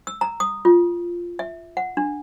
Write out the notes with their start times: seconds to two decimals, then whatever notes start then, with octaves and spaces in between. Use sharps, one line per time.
0.07 E6
0.21 A#5
0.40 D#6
0.65 F4
1.39 E5
1.77 F#5
1.97 D4